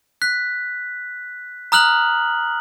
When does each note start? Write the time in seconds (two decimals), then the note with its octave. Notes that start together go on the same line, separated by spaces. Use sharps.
0.22 F#6 B6
1.72 A#5 D#6 F6 F#6 F#7